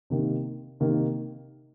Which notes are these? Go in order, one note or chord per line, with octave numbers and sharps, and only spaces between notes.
C3 D#3 A#3
C3 D#3 A#3